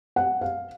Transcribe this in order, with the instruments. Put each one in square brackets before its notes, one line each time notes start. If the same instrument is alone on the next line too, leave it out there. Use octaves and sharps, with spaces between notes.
[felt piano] F#5
F5